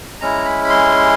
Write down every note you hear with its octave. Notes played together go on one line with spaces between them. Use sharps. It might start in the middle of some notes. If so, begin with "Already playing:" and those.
G#3 C#4 E4 A#5
B5
B5
C6